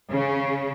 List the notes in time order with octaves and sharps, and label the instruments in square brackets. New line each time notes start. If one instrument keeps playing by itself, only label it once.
[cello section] C#3